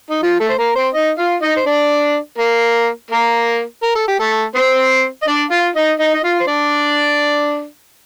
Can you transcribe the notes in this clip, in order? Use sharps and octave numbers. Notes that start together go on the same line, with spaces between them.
D#4
F3 F4
A3 A4
C5
A#3 A#4
C4 C5
D#4 D#5
F4 F5
D#4 D#5
C5
D4 D5
A#3 A#4
A#3 A#4
A#4
A4
G4
A3 A4
C4 C5
D#5
D4 D5
F4 F5
D#4 D#5
D#4 D#5
D#5
F4 F5
C5
D4 D5